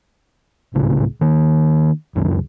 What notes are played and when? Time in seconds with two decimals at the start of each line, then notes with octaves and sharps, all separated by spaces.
0.74 G#1 C#2 A2 C#3
1.21 D#3 A#3
2.15 F1 C#2 F#2 D#3